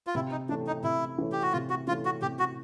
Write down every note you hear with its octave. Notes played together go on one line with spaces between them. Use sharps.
F4
C3 E4
D#4
E3 A3 C#4 D4
D#4
C3 E4
E3 A3 C#4
G4
F#4
C3 F4
F#4
E3 A3 C#4 F4
F#4
C3 G4
F#4